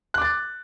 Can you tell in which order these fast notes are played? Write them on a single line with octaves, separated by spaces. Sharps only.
F#6 D6 A6